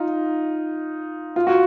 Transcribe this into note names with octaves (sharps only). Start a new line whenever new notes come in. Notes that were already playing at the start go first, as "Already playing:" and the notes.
Already playing: D#4 F4
F4
F#4